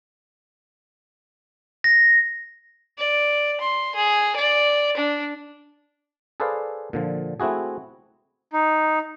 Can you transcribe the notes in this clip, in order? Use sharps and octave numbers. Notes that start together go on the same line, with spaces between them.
A#6
D5
C6
G#4
D5
D4
G#4 A4 B4 C5 D5 F5
A#2 D3 F3
A3 C4 E4 F#4 G#4
D#4